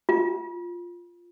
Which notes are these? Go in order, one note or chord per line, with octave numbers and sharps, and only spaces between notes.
F4